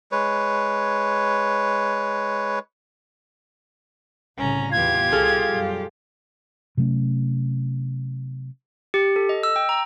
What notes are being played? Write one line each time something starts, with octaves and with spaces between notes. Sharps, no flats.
G#3 B4 C#5
C2 A2 C#3 C#4 A#5
E2 A2 B3 F4 G4 G#6
C2 B2 G#4 A4 F5
F#2 B2 G3
C3 F#3 A3 C#4
G4
A4
D#5
E6
G5
A#5